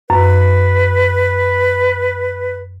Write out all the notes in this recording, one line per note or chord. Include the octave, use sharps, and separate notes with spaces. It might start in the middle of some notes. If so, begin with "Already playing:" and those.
F#2 B4